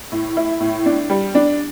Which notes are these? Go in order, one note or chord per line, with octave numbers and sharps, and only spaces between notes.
A2
E4
A2
D4
G3
D4